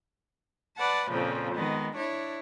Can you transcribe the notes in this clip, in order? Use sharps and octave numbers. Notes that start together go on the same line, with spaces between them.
B4 D5 F#5 A5
F2 A#2 C#3 F3
D#3 G#3 B3
D4 E4 C#5